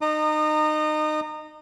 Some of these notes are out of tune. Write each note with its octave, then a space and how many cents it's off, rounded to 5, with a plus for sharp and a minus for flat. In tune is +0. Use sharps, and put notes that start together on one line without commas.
D#4 -25 A#5 -20 D#6 -35